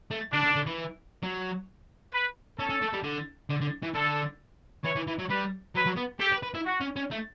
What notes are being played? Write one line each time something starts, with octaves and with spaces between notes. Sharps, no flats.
A3
D3 D4
D3
D3
E3
F#3
B4
C#4 A4
C#4
A3
G3
D3
D3
D3
E3
D3 A4
E3 C#5
E3
E3
F#3
G3 B4
F#3 B4
F#3
B3
G4 A4
B4
B4
E4
F#4
C#4
C#4
A3